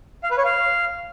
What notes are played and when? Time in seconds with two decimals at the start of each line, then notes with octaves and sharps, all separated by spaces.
0.24 F5
0.31 B4
0.38 C#5
0.45 F5